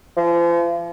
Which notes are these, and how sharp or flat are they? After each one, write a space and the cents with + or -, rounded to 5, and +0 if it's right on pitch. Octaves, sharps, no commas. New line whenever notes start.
F3 -40